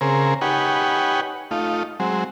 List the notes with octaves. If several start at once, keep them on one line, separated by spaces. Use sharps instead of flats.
C#3 C4 G#4 A#4
D#4 G4 B4 C#5 F#5 G#5
A3 D#4 F4
F#3 G#3 C4